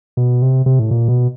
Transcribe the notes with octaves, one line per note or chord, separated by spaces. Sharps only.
B2
C3
C3
A2
A#2
B2